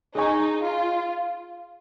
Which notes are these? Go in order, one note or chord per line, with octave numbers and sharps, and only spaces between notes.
D#4 G#4 D#5 G#5 C#6
F4